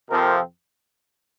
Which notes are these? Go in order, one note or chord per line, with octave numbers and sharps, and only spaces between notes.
F2 C3 F3 C4 A#4